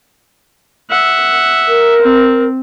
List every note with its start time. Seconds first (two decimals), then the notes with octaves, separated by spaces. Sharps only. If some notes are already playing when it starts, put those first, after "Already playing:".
0.90 E5 F#5
1.67 A#4
2.01 C4